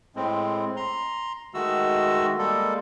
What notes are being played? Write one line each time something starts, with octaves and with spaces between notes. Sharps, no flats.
A2 G#3 C4
A#5 C6
D#3 G#3 A3 F#4 E6
G3 G#3 A#3 A4